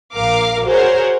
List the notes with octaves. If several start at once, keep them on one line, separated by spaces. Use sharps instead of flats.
A#1 A#4 F5 D6
F#4 G#4 A#4 C5 C#5 F#5